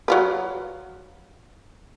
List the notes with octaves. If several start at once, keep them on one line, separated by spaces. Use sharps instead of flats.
F#3 F4 B4